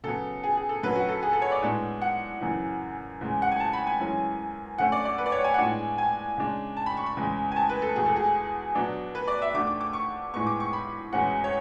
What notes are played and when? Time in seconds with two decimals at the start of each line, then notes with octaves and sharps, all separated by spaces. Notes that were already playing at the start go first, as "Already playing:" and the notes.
0.04 C#3 F#3 B3 A4
0.44 G#4
0.57 G#4
0.69 A4
0.83 F#2 D3 F#3 C#4 B4
0.96 F#4
1.09 A4
1.23 G#4
1.33 A4
1.42 C#5
1.52 D5
1.62 A2 G#3 B3 D4
2.02 F#5
2.41 F#2 C#3 E3
3.21 E2 C#3 G#3
3.42 F#5
3.52 G#5
3.60 A5
3.73 B5
3.87 G#5
4.00 F#2 E3 G#3 C#4
4.78 D3 A3 C#4 F#5
4.92 D5
5.05 D5
5.18 B4
5.26 D5
5.32 C#5
5.44 G#5
5.54 F#5
5.58 A2 G#3 B3 D4 G#5
5.98 G#5
6.37 C#3 G#3 D4
6.77 A5
6.86 B5
6.97 C#6
7.06 B5
7.17 E2 C#3 G#3
7.52 G#5
7.56 A5
7.69 B4
7.82 A4
7.95 E2 B2 G#3 G#4
8.06 A4
8.16 G#4
8.75 B2 F#3 B3 D4
9.15 B4
9.28 D5
9.42 E5
9.54 D3 A3 D4 D6
9.67 D6
9.81 D6
9.93 C#6
10.34 A2 G#3 B3 C#6
10.47 D6
10.60 C#6
10.73 B5
11.13 E2 B2 G#3 C#4 F#5
11.44 C#5